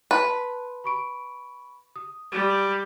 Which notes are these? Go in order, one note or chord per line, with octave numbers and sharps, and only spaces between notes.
B4 A5 C6
B5 C#6 D7
D#6
G3